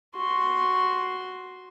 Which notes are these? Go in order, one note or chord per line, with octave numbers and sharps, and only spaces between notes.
F#4 C6